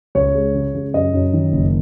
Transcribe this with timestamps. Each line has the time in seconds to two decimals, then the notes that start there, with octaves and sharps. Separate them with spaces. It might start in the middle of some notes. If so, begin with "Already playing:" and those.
0.15 C#2 C#5
0.35 G#3
0.54 C#3
0.75 C#3
0.94 F#2 D#5
1.14 F#2
1.33 D#3
1.53 F#1